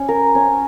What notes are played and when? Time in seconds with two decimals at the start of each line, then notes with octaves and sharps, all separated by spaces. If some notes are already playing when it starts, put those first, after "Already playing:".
Already playing: C#4
0.08 A#4
0.35 C#4